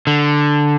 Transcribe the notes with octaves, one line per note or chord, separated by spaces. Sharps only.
D3